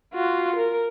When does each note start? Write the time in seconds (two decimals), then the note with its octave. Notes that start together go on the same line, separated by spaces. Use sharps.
0.14 F4 F#4
0.56 A#4